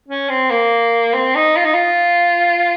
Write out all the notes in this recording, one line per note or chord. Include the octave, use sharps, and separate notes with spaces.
C#4
C4
A#3
C4
D#4
F4
D#4
F4